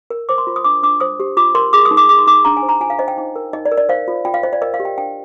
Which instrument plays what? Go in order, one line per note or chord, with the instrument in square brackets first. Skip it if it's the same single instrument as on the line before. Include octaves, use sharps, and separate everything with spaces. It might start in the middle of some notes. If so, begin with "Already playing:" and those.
[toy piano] A#4
C5 D6
C6
F4
D#6
D4 D6
D4 D6
C5 D#6
G4
F4 D6
A#4 C6
G#4 D6
D#6
D#4
D6
G#4 D6
C6
D#4 D6
D4 A#5
G#5
C5
A#5
F4 G#5
F5
C5 D#5
G5
D#4
A#4
D#4 D#5
D5
A#4
D5
C5 F5
F4
F4 G5
F5
C5 D#5
D5
A#4 D#5
F5
G4
G5
D4 G5